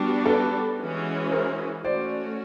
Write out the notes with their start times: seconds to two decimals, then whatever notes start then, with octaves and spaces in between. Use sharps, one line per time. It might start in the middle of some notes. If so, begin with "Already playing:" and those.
Already playing: G3 B3 D4 F#4
0.26 A4 B4
0.79 E3 G#3 C#4 F#4
1.31 A#4 C5
1.84 A3 C#4 F#4 C5 D5